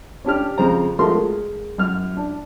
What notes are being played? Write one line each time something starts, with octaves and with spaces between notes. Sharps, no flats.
C#4 D4 G4 F6
F2 C#3 C5 A#5
F3 G#3 A3 F#4 A#4 C6
G#3 A#4
F#2 F6
D4